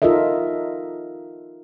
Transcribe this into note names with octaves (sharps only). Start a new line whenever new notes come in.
D#4 F4 A4 A#4 D#5 E5